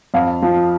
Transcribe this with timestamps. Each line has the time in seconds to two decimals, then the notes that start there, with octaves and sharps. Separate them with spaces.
0.14 F2 F5
0.42 F3